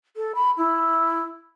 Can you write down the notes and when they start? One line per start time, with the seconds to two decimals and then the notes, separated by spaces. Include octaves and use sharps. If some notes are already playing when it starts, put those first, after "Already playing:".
0.16 A4
0.35 B5
0.57 E4